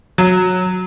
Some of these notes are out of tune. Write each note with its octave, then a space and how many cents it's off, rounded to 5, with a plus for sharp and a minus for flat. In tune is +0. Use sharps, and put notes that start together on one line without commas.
F#3 -10